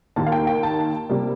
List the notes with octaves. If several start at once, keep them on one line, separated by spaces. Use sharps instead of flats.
D#2 D#3 A#3 A5
F5
G5
G5
A5
C3 G3 A#3